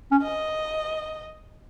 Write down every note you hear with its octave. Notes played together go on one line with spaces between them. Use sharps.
C#4
D#5